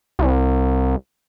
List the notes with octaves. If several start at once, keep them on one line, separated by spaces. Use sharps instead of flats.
C2